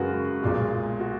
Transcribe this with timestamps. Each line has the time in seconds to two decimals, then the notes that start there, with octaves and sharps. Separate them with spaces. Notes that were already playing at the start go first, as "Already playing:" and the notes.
Already playing: F#2 C#3 G#3 F#4 G#4 A#4 B4
0.43 B1 A#2 G#3
1.00 F#4